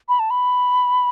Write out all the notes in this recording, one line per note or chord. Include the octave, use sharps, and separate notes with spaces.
B5
A5
B5